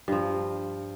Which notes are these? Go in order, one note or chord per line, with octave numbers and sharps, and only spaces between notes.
G2 F3